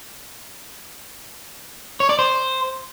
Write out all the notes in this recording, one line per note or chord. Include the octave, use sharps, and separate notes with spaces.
C#5
D5
C5